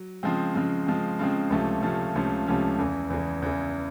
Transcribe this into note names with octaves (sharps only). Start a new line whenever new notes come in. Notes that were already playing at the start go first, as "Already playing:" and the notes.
Already playing: F#3
C#3 F3 G#3 C4
C#3 F3 G#3 C4
C#3 F3 G#3 C4
C#3 F3 G#3 C4
C#2 C3 F3 A3 C#4
C#2 C3 F3 A3 C#4
C#2 C3 F3 A3 C#4
C#2 C3 F3 A3 C#4
E2 C#3 E3
E2 C#3 E3
E2 C#3 E3